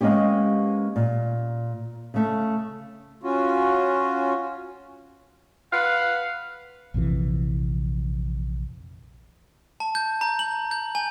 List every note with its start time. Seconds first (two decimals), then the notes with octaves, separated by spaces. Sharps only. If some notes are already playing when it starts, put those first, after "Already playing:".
0.01 G#3 A#3 B3 C#4 G4
0.96 A#2
2.14 C#3 A3
3.23 C#4 F4 F#4
5.72 B4 F5 F#5
6.94 A#1 F2 C3 E3
9.80 A5
9.95 G6
10.21 A#5
10.39 F#7
10.71 G6
10.95 G#5